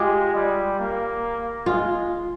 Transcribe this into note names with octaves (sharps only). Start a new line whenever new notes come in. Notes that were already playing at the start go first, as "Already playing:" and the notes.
Already playing: G#3 F4 G4
G3
A#3
G#3 F4